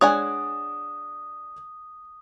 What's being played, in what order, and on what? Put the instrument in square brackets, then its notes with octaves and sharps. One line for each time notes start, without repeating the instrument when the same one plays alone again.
[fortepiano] G#3 D4 D5 [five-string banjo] C#5 F#5 G#5 [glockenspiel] D#6